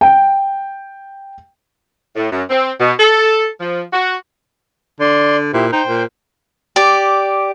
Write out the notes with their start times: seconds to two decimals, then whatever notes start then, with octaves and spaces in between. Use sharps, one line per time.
0.01 G5
2.15 A2
2.31 F#2
2.50 C4
2.79 B2
2.99 A4
3.60 F3
3.92 F#4
5.01 D3 D5 C6
5.53 A#2 E4 G4 C5
5.73 D#4 C5 G5
5.87 A#2
6.76 G4 D5